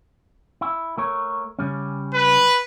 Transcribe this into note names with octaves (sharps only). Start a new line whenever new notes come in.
E4
A3 A#4 C#5
C#3 G3 C#4
B4